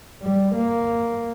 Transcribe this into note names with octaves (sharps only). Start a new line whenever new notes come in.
G3
A#3